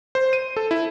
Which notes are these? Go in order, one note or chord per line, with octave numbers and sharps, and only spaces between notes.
C5
D#7
A4
E4